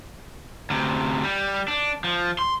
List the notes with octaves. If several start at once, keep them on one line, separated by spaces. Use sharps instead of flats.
D2 C3
G3
D4
F3
C6